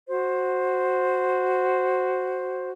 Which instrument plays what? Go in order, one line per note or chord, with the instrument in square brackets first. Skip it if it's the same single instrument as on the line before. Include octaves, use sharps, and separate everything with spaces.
[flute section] F#4 C5